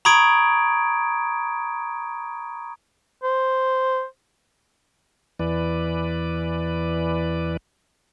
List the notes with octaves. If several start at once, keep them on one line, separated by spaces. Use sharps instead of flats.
A#5 B5 C#6 D#6 G#6 D7
C5
E2 E3 B4 D5